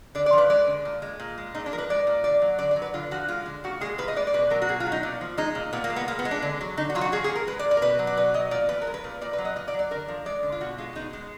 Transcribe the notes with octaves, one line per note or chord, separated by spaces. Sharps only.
D3 D5
D5
F3
B4
G#3 D5
D3
A#2
G#3
A#2
G#3
A#2 D#4
D4
F3 A#4
B4
G#3 D5
A#2
D3 D5
F#3
D3 D5
D5
F#3
B4
D3 F4
F3 F#4
G#3 F4
D3
A#2 F#4
G#3 G#4
A#2 B4
D#5
G#3 D5
D5
B2 B4
F#3 A#4
F#4
B2 G#4
F4
F#3
D#4
A#2
F3
G#3 D#4
A#2
A#2 B3
A#3
G#3
B3
A#2 A#3
B3
G#3
D4
D3
F#3
D3 D#4
F#4
F#3 F4
F#4
A#2 G#4
G#4
F3
A#4
G#3 B4
D5
A#2
D5
A#4
B2 B4
F#3
D5
B2 B4
F#3 D#5
A#2 D5
F3 B4
A#4
G#3
B4
A#2
A#2 D5
B4
F#3
D#5
A#2 D#5
D5
F#3
D5
D3 A#4
F3
G#3 D5
D3
F4
B2 F#4
G#3 F4
B2 D#4
G#3